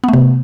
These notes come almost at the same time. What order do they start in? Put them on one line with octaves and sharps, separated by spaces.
B3 A3 C3